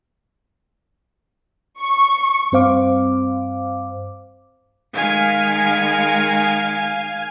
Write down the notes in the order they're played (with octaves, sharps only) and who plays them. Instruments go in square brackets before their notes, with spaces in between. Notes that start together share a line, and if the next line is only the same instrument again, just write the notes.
[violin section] C#6
[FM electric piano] G2 C4 C5 F5 D6
[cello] D#3 G#3 [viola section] F5 G#5